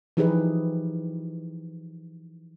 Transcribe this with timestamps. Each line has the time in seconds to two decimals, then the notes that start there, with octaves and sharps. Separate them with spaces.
0.17 E3 F3 D#4 G4 G#4 B4